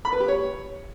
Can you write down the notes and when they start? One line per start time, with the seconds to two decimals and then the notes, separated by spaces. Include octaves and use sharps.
0.05 B5
0.13 B4
0.20 G4
0.28 C#5